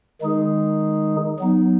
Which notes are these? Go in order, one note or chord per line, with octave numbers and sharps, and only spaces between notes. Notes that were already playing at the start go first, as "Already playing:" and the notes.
D#3 G#3 D#4 G#4
F#3 B3 D#4